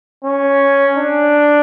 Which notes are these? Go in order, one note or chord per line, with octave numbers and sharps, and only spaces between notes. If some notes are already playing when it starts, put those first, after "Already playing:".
C#4
D4